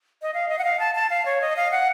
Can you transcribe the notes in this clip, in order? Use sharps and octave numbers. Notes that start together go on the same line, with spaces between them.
D#5
F5
D#5
F#5
F5
A5
A5
F5
C#5
D#5
F5
F#5